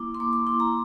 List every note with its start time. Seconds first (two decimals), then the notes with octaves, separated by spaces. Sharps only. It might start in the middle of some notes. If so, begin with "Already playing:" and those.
Already playing: A#3 E4 D6
0.15 C6
0.20 A#3 D6
0.33 D6
0.47 E4 C6
0.60 A#5